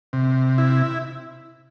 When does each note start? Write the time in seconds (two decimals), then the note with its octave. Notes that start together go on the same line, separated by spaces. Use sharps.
0.13 C3
0.58 E4